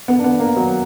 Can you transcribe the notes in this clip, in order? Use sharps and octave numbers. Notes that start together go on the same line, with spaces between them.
B3
D4
B3
A#3
F#3